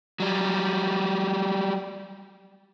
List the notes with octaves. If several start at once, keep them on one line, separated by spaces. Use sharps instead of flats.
F#3 G3